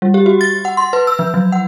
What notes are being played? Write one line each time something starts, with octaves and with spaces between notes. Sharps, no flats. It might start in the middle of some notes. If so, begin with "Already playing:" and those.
G3
G4
F#4
A6
F#5
C6
B4
E6
F3
F#3
F#5